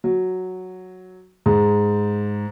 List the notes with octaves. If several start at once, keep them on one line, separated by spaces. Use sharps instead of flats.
F#3
G#2